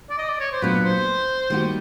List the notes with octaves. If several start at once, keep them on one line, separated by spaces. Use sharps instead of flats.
D5
D#5
D5
C#5
C5
A#2 F#3 B3 D4 B4
C5
D#3 G3 A#3 D#4 F#4